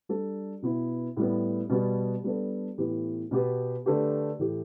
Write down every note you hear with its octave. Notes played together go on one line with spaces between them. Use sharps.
G3 D4 A4
B2 B3 E4 B4
A2 G3 B3
B2 G3 B3
G3 B3 D4 A4
A2 E3 B3 G4 B4
B2 B3 G4 B4
D3 A3 D4 G4 B4
A2 E3 A3 G4